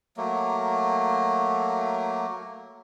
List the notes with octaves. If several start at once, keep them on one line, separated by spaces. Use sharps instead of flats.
F#3 A3 A#3